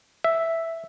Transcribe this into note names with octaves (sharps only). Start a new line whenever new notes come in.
E5